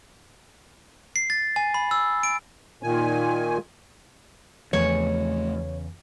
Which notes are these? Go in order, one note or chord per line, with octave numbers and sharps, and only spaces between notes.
C7
A6
G#5
B5
E6
D7
A#2 D#3 G#5
E2 C#3 F3 A3 C#5 G#5